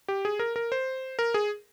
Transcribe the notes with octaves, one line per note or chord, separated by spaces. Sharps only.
G4
G#4
A#4
A#4
C5
A#4
G#4